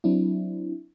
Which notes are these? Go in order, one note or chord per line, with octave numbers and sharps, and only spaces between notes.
F#3 C4 D4 E4